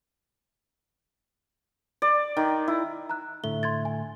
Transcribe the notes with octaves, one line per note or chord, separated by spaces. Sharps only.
D5
D#3
E4
A#5 F#6
A2 D3 A3 G7
C6 G#6 A6
G#5